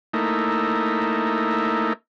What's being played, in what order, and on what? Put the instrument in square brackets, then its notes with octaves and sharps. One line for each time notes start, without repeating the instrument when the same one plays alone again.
[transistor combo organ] A3 A#3 D#4 E4